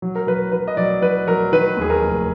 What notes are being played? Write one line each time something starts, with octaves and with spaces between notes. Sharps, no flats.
F#3
A#4
F#3 B4
F#3 B4
D#5
F#3 D5
F#3 B4
F#3 A#4
D#3 B4
D#2 G#4
A#4
F1